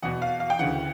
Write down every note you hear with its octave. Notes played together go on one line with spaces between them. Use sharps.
E2 B2 F#5
F5
F5
G5
D2 C#3 E3 F#5